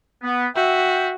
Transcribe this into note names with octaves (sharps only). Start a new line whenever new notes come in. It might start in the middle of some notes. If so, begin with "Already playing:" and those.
B3
F#4 E5 G5